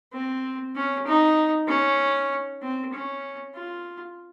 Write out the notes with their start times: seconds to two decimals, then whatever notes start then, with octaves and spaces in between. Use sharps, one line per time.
0.13 C4
0.76 C#4
1.07 D#4
1.68 C#4
2.62 C4
2.93 C#4
3.55 F4